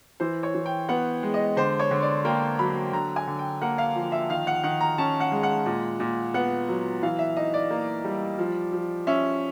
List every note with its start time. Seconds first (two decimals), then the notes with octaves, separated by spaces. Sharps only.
0.20 E3 C5
0.43 C#5
0.55 E3
0.66 G5
0.89 B3 F#5
1.23 G#3
1.34 D#5
1.57 D3 C5
1.79 C#5
1.91 D3
2.02 D5
2.25 A#3 G5
2.59 F#3 B5
2.93 D3 A#5
3.16 G#5
3.27 D3
3.39 G5
3.62 A#3 F#5
3.78 F5
3.96 F3
4.12 E5
4.30 D#3 F5
4.47 F#5
4.64 D#3 F#5
4.81 A#5
4.98 C#4 A5
5.20 F#5
5.32 G#3
5.43 F#5
5.66 A#2
6.00 A#2
6.34 B3 F#5
6.69 F#3
7.03 E3 F5
7.19 E5
7.37 D#4 D#5
7.54 D5
7.71 A#3
8.05 G3
8.38 F3
8.73 F3
9.07 C#4 E5